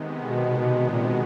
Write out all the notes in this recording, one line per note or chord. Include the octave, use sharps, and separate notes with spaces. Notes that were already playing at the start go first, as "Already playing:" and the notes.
Already playing: C3 D#3 G#3 B3
B2
B2
A#2
B2